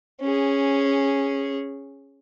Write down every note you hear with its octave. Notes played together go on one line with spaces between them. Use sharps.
C#4 G#4